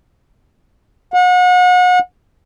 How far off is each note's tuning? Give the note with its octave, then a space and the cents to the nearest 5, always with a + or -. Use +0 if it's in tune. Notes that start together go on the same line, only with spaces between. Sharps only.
F#5 -35